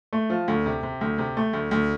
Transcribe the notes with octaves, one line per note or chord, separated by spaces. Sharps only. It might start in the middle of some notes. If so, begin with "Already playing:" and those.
A3
F3
D2
C3
C3
D2
C3
A3
D2
D2